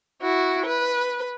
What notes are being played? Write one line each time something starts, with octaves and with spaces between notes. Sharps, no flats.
E4 F#4
B4